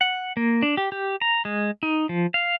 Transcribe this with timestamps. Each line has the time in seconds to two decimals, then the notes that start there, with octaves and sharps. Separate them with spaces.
0.01 F#5
0.37 A#3
0.62 D4
0.77 G4
0.92 G4
1.21 A#5
1.45 G#3
1.83 D#4
2.09 F3
2.34 F5